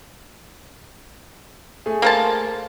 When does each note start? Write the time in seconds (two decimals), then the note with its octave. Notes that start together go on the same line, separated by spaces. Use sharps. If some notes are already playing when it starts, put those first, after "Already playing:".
1.86 A3 G#4
2.02 A#3 C5 A5